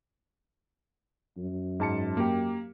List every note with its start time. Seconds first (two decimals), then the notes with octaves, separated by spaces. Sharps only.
1.37 F#2
1.80 G#2 A5 C#7
2.17 A#3 G4